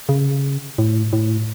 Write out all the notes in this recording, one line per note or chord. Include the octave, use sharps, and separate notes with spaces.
C#3
A2
A2